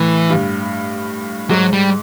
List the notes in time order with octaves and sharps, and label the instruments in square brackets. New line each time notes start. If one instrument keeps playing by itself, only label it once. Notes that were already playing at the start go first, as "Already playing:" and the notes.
Already playing: [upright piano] A2 [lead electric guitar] E3
[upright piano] G2
[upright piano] G#2 [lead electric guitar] F#3
[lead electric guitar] G3